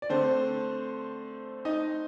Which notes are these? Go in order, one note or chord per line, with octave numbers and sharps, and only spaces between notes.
D5
D3 A3 C4 C5
D#4 D#5